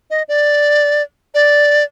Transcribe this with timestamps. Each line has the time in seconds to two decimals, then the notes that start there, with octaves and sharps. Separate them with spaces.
0.10 D#5
0.28 D5
1.34 D5